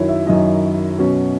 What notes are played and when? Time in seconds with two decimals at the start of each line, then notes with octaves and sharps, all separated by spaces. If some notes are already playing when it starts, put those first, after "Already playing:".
Already playing: F#2 D#3 F#3 E4 C#5
0.09 E5
0.27 F#2 D#3 F#3 D#5
0.99 B2 F#3 C#4